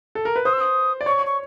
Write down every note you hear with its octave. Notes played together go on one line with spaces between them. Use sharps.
A4
A#4
B4
C5 D#6
E6
D#6
D5
C#5 C#6
C#6